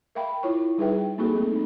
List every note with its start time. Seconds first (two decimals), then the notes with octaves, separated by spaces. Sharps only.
0.15 A#4 E5 F5 G5 B5
0.43 E4 F4 C#5 C#6
0.78 G3 D#4 G#4 B4 E5 G5
1.18 A#3 C4 D#4 F#4 G#4 A4
1.35 F#3 A3
1.52 C4 D#4